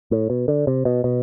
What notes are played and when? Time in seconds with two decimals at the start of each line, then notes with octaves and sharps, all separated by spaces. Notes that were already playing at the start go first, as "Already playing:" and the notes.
0.11 A2
0.30 B2
0.48 D3
0.67 C3
0.85 B2
1.04 B2